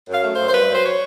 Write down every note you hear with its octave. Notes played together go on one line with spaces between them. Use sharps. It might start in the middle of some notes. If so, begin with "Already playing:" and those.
F#2 F5
A3
C5
F#2
C5
G2 B4
F#3 C5
C#5